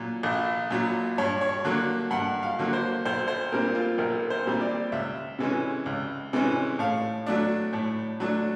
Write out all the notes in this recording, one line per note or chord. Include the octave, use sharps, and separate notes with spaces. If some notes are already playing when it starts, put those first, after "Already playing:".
Already playing: A#2 F#3
A#1
A#2 F#3
G2 C#5
C#5
D3 F#3 A#3
G2 F#5
F5
D3 F#3 A#3
C5
B1 C5
C5
A#2 G3 C4 A#4
F4
B1 A#4
C5
A#2 G3 C4
D5
C#2 E5
C3 E3 G#3 C#4
C#2
C3 E3 G#3 C#4
A2 F5
F#3 A3 D4
A2
F#3 A3 D4